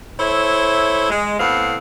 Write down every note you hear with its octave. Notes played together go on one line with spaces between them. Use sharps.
E4 A4 C5 C#5 E5
G#3
A2 B3 C4 F5 F#5